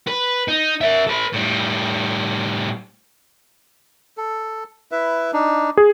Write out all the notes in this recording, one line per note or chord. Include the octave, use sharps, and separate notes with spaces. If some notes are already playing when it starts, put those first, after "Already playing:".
B4
D#4
A#4 E5
A4 B4
A2 G3
A4
E4 B4 E5
D4 D#4
G#4